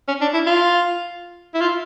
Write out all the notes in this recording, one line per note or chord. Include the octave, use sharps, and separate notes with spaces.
C#4
D4
E4
F4
E4
F4